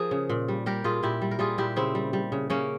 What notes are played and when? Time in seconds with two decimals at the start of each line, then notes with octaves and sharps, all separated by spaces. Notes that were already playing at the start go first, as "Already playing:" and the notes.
Already playing: F3 G#4 A#4
0.11 C#3
0.30 A#2
0.48 G3
0.66 G3 G4 A#4
0.84 A#2 F4 G#4
1.03 A#2 E4 G4
1.21 G3
1.31 A#4
1.39 G3 F4 G#4
1.58 A#2 E4 G4
1.76 C#3 C4 E4
1.95 G3
2.13 G3
2.32 C#3
2.50 C#3 A#3 C#4